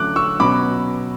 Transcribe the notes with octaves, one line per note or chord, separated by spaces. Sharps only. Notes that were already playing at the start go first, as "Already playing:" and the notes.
Already playing: D3 F#3 A3 C#4 D6 F#6
C#6 E6
B2 F#3 C#4 B5 D6